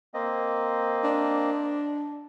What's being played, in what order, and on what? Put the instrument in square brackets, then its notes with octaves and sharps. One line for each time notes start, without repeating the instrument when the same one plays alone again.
[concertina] A#3 C4 D#5
[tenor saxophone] D4